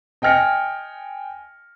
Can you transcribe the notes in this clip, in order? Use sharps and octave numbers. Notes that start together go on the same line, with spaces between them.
D#5 G5 G#5 F6 A#6 C#7